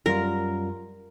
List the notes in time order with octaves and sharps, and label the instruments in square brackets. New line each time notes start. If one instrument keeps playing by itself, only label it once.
[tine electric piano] F#2 G3 F4 [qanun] A#4